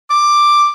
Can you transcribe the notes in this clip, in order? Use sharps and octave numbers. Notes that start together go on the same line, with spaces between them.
D6